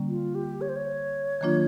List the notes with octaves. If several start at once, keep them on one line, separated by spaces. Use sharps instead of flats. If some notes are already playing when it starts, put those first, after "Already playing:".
Already playing: D3 G3 A#3 C#4
F4
G4
C#5
C5
C#5
D#3 F#3 A#3 D4 F4